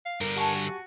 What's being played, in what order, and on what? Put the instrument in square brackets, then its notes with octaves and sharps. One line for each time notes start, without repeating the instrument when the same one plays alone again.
[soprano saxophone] F5
[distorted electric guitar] G2 D3 [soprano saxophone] A#4
[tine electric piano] G4 F#5 C#6 [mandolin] G#5 A5
[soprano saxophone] F#4